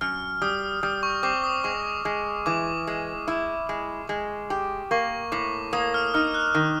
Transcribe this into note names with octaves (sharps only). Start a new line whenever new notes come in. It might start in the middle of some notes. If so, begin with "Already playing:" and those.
F#2 F6
G3 D#6
G3 D#6
C#6
C4 D6
D#6
G#3 C#6
G#3
E3 D6
G#3
E4
G#3
G#3
G4
A#3 C#6
A2 D6
A#3 D#6
F6
D#4 F6
F#6
D#3